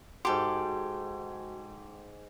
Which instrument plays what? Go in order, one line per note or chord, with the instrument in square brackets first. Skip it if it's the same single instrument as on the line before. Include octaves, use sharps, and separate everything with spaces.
[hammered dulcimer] G#2 D6 [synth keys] F#4 [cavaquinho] G4 A4 [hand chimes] C6